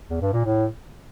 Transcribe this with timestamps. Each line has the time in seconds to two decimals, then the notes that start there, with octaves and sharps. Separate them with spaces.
0.10 E2
0.22 G2
0.33 A#2
0.45 A2